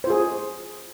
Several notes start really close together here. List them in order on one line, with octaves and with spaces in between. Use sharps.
C5 F4 G#4